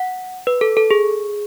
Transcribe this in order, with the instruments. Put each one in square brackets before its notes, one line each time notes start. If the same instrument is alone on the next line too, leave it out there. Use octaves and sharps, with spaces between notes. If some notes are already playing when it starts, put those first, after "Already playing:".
Already playing: [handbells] F#5
B4
A4
A4
G#4